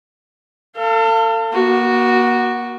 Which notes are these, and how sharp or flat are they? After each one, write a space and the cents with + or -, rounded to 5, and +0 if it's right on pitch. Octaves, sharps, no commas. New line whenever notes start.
A4 +35 F5 -25
A#3 +35 F#4 +0